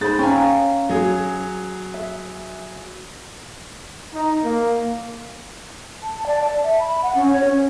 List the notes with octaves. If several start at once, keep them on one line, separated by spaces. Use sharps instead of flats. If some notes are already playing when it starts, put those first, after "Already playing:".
G#2 G#4 C5 B5 A6
C#4 F5 G5 G#5 A#5
F#3 G#4
E5
D#4
A#3
A5
D5
A5
E5
B5
F#5
C#4
C#5
C#4